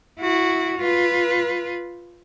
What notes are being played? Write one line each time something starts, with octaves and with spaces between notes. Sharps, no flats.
E4 F#4
F4 B4